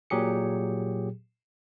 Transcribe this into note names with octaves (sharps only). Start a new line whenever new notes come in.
A#2 F#3 G4 G#4 C#7